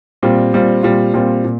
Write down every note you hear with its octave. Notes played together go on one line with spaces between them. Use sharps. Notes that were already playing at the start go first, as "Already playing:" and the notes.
A#2 G3 C4 F4
A#2 G3 C4 F4
A#2 G3 C4 F4
A#2 G3 C4 F4
A#2